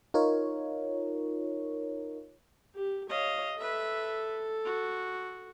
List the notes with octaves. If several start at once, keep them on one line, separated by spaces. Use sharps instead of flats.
D#4 F4 A#4 C#5
G4
C#5 D#5 F5
A4 B4 E5
F#4